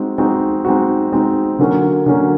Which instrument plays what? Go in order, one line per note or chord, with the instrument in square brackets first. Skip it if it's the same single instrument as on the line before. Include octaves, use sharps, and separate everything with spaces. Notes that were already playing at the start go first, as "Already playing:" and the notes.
Already playing: [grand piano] G#3 C4 D#4 F#4
G#3 C4 D#4 F#4
G#3 C4 D#4 F#4
G#3 C4 D#4 F#4
D3 F#3 A#3 C#4 F#4
D3 F#3 A#3 C#4 F#4